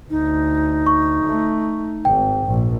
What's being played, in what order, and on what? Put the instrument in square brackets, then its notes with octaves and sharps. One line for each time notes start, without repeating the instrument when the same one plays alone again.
[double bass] D2 [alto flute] D#4
[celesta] C#6
[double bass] A3
[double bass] G#1 G#2 [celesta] G5
[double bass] A#1